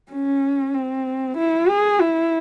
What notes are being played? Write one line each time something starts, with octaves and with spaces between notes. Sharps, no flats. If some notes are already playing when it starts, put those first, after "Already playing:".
C#4
C4
E4
G#4
E4